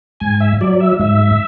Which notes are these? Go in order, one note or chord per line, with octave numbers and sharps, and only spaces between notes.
G#2 G#5
E5
F#3 D5
E5
G#2 E5